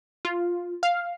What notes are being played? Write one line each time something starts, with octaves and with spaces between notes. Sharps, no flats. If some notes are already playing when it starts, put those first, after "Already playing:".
F4
F5